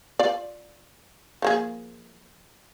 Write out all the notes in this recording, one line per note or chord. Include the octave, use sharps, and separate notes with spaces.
F4 D5
F3 A#3 G#4